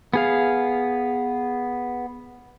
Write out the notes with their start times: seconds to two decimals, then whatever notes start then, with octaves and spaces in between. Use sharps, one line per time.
0.14 B3 G#4 F5